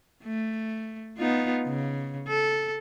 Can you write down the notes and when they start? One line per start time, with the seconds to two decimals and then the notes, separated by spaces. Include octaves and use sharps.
0.23 A3
1.18 B3 D#4 F4
1.67 C#3
2.28 A4